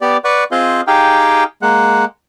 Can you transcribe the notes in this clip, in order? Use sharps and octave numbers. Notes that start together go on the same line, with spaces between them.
B3 G4 D5
B4 D5 F#5 C#6
C4 F4 G#4 C5 D#5 F5
D#4 G4 G#4 F5 G5
G#3 A#3 F#5